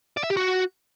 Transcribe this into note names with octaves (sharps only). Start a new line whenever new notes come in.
D5
E5
G4
F#4